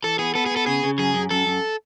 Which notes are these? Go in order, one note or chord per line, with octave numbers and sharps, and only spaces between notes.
E3 A4
B3 G#4
B3 A4
G#4
B3
A4
C#3 G#4
C#3
F#2 G#4
F#2
F#2 A4
F#2